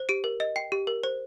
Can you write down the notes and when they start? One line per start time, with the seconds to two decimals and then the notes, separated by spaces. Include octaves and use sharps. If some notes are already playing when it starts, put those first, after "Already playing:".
Already playing: C5
0.09 G4 D7
0.24 A#4
0.40 D#5
0.56 G5 C7
0.72 G4
0.87 A#4
1.04 C5